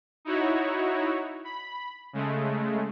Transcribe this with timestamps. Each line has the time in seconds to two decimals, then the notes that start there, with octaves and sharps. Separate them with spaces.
0.25 D#4 E4 F#4 C#5
1.44 B5
2.13 C#3 G#3 A3